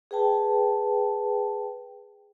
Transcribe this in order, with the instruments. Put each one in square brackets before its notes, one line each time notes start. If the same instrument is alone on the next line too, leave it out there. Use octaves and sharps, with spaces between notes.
[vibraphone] G#4 B4 G5 A5